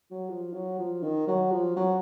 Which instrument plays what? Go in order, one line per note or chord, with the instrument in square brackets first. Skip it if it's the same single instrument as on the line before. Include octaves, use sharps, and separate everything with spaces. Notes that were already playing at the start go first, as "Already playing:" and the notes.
[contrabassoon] F#3
F3
F#3
F3
D#3
F#3
F3
F#3